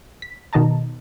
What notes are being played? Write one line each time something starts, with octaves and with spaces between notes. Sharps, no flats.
B6
B2 D#3 D#5 A5 A#5